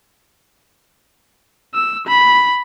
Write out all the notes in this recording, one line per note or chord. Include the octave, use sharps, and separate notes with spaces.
E6
B5